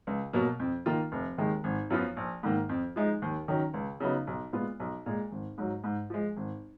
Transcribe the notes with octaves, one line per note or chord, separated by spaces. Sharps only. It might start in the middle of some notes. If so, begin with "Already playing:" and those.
C#2
B2 F#3 A#3
F2
D#3 A#3 F4
F1
D#2 D#3 G#3
G#1
F#2 F3 B3 F4
A#1
G#2 D#3 A#3
F2
F3 G#3 D#4
D#2
D#3 F#3 C#4
C#2
C#3 F#3 B3 D#4
B1
A#2 G#3 B3 F4
B1
A#2 G#3
G#1
G#2 F#3
G#2
F3 G#3
G#1